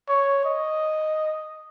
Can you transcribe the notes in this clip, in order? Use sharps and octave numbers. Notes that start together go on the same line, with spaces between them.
C#5
D#5